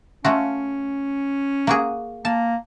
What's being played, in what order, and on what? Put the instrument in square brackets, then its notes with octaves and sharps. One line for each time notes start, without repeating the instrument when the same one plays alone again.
[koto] A3 F4 F#4 [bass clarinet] C#4
[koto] A#3 F#4 G#4
[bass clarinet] A#3 [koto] A5